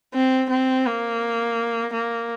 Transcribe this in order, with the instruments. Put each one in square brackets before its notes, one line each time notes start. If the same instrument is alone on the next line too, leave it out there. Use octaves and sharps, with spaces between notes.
[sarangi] C4
C4
A#3
A#3